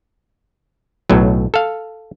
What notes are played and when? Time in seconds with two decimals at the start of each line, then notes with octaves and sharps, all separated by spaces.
1.10 B1 A2 F#3
1.54 A4 F5